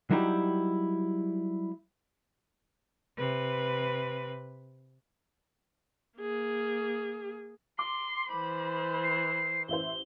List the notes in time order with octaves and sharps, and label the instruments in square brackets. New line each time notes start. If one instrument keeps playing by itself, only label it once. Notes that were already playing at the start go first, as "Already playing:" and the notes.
[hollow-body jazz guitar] F#3 G3 D#4 E4 G4
[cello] C3 B4
[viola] A#3 G#4
[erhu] C6 [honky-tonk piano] D6
[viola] E3 C5 [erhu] B5
[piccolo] C7
[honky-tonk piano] A1 E4 C5 [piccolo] G7